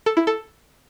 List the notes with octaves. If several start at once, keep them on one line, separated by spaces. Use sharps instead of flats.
A4
E4
A4